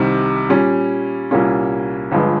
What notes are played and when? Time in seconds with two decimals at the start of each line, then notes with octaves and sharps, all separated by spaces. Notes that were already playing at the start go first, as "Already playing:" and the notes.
Already playing: C2 C3 D#3 G3
0.49 A#2 G3 C#4
1.31 C2 A#2 G3 A#3 C#4
2.11 G1 G2 F3 G#3